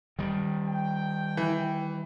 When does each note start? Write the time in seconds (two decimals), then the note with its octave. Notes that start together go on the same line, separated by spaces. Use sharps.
0.19 D#3 G3
0.68 G5
1.37 E3